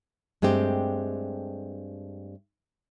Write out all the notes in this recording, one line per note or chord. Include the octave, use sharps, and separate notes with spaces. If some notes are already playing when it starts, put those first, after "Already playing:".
G2 G#3 A3 C4 G4